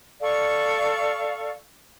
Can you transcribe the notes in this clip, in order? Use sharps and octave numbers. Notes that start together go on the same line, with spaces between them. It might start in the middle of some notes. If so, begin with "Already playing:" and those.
A4 D5 F5 C#6